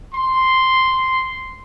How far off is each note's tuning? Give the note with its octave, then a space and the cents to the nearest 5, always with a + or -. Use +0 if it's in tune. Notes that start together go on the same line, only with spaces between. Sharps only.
C6 -5